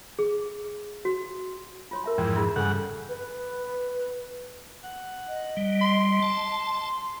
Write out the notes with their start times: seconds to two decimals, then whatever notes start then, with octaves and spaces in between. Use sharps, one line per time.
0.19 G#4
1.05 F#4
1.91 F4 C#5 C6
2.04 A#4 E5 A5
2.18 F2 G#2 E3 G5
2.36 E4 F4 G#4
2.56 G2 C#3 A4 F#5 G#5
3.08 B4
4.84 F#5
5.28 D#5
5.57 G3
5.82 C6
6.23 A5